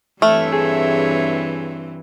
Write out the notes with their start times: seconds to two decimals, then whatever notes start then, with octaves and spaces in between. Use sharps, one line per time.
0.22 G2 E3 A3 C4 C#5 E5 F6
0.53 G#4